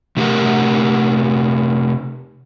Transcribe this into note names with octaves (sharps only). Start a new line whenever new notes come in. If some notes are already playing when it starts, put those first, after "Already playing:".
C3 A3 E4 G4 A#4 F#5